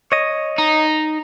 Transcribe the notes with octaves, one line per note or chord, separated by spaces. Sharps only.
C#5 D#5
D#4